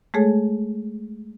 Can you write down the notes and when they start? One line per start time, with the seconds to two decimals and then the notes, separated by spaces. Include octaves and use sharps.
0.14 G#3 A3 G#4 A4 C#5